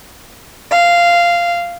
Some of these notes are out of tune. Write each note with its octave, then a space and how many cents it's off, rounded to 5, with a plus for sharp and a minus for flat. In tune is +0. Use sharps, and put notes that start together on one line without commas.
F5 -10